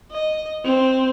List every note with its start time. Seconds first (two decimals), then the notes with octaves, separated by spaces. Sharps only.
0.11 D#5
0.65 C4